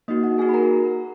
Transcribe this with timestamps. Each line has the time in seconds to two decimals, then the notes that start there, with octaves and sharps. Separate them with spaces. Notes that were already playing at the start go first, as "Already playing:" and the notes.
0.08 A#3 D#4 F#4 D#5
0.23 F#4 F#5
0.38 A#3 D#4 F#4 G#4 G#5
0.49 B5
0.54 A#4 A#5